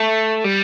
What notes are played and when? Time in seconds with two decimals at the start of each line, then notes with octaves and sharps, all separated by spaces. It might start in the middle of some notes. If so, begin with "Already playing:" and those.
Already playing: A3
0.44 G3